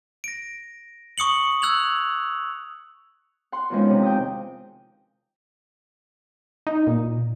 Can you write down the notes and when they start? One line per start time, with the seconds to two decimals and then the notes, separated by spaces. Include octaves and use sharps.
0.24 A#6 D7
1.18 C#6 D#6 C#7 F#7
1.62 E6 F#6 G#6 F7 F#7
3.52 F#5 C6
3.70 E2 D#3 F3 G#3 C#4
3.90 C3
4.03 G5 D#6
6.67 D#4
6.87 A#2